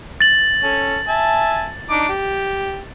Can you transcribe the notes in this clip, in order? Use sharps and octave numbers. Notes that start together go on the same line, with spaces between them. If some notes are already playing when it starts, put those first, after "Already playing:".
A6 F#7
C#4 A4
E5 G#5 A5
D4 D#4 D6
G4